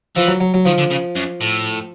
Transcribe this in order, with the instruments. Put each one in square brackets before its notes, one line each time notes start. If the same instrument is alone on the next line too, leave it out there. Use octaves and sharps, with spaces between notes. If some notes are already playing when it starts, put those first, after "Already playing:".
[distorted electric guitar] E3 [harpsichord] F3
[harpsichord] F#3
F#3
F#3
[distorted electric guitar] D#3 [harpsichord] F3
[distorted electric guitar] D3
C#3
F#2
A2